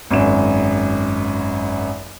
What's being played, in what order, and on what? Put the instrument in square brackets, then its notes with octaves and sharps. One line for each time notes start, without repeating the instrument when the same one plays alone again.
[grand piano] G#1 F#2 E7